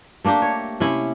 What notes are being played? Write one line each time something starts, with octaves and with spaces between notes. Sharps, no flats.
A3 A#3 D4 G4
C#5
C3 C#4 E4